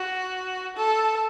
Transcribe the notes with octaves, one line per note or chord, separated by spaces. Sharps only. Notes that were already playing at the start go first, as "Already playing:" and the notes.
Already playing: F#4
A4